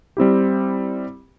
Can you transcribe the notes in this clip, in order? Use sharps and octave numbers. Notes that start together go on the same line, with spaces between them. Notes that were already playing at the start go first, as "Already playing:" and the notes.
G3 C4 E4 G4